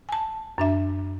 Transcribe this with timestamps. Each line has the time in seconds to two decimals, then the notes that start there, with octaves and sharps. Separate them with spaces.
0.09 G#5 A5
0.58 F#2 D4 E5